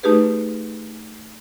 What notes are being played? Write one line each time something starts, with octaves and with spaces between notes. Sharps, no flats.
A3 D#4 G4 G#4 B4